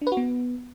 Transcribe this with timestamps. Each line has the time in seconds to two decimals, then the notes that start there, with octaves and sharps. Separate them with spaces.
0.01 D4
0.07 B4
0.12 F#4
0.17 B3